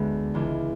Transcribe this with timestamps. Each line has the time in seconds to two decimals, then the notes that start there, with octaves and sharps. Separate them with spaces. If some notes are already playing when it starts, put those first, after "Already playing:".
Already playing: D2 D3 G#3 B3
0.34 C#2 C#3 E3